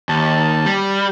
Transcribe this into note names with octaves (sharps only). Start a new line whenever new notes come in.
D#2 A5
G3